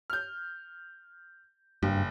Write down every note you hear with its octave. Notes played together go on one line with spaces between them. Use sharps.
F6 G6
F#1 G2